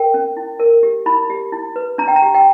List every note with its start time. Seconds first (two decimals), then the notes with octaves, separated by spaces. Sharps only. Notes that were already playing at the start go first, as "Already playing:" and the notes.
Already playing: A#4 G5
0.14 C#4
0.37 E4
0.59 A#4
0.83 G4
1.06 E4 B5
1.30 G4
1.52 E4
1.76 B4
1.98 D4 A#5
2.08 G5
2.16 A#5
2.22 G4
2.34 G5